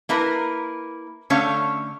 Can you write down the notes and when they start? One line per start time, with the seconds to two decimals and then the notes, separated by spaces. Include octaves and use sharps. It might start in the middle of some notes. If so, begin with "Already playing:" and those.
0.09 A#3 E4 A#4 B4
1.30 D3 A3 C#4 C#5 E5 F5